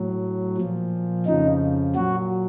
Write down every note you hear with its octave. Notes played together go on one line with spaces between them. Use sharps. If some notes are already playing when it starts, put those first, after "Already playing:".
Already playing: A2 F#3
A#2 F3
F2 C#3 F3 D#4
A#2 F#3 F#4